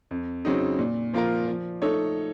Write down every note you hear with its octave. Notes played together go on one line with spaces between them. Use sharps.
F2
C#3 F#3 C4 D#4
A#2
F3 A#3 F4 A#4
F3
A3 D#4 A4 C#5